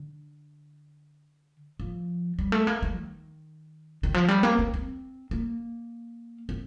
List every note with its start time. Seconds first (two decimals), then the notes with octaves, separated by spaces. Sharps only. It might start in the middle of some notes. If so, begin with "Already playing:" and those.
Already playing: D3
1.80 F3
2.39 G3
2.52 A3
2.67 A#3
2.82 A3
2.96 D#3
4.03 D#3
4.14 F3
4.28 G3
4.43 A#3
4.59 C4
4.74 C4
5.31 A#3
6.49 C4